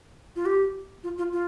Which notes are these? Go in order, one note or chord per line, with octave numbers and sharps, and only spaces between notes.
F4
G4
F4
F4
F4